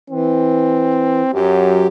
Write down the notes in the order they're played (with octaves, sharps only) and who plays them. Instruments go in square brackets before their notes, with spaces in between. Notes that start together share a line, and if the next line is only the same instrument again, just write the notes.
[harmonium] E3 [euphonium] C4
[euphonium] F#2 [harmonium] F#3 G4